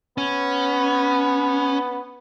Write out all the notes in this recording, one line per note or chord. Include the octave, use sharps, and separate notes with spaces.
B3 C#4